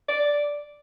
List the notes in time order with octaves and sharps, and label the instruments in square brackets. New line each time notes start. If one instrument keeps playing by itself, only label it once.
[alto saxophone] D5